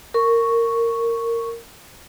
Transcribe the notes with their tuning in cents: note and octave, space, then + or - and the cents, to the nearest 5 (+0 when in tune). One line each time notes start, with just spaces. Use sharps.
A#4 -15 C#6 +0